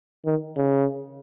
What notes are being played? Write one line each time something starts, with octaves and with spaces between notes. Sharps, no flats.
D#3
C#3